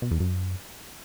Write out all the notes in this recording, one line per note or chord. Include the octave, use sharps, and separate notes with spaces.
B2
E2
F#2